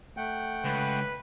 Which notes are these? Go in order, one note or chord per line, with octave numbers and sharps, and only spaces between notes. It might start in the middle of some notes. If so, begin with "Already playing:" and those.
A3 F#5 G5
C#2 B4